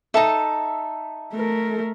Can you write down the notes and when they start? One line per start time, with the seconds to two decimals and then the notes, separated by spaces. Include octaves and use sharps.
0.14 D#4 A4 E5
1.34 A3 A#4